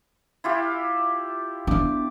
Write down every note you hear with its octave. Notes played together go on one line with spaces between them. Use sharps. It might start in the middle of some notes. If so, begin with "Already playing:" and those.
E4 F4 G4
B3 D4 D6